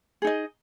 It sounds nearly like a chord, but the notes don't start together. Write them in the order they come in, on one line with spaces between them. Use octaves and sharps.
G#4 D#4 D#5